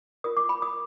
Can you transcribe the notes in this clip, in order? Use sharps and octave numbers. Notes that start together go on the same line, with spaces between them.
F4 A#4 D#6
D6
B5
D#6